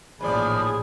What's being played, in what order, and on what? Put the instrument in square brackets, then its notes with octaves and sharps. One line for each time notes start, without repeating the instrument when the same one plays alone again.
[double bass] A1 A#2 [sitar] D#2 F3 D5 [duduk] G#4 [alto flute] B5